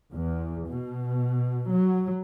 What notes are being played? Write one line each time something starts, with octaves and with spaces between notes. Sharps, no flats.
E2
B2
F#3